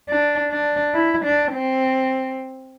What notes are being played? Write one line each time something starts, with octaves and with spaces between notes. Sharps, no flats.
D4
D4
E4
D4
C4